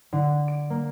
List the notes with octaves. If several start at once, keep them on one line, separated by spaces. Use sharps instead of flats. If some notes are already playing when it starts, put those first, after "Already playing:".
D3
D7
A#3